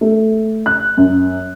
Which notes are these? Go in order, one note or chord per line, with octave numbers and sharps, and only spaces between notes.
A3
F#6
F#2